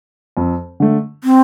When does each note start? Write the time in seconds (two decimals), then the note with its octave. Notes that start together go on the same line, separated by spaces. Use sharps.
0.37 F2
0.80 D3 A3
1.24 C4